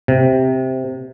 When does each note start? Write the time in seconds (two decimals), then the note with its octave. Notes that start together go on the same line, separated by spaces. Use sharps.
0.08 C3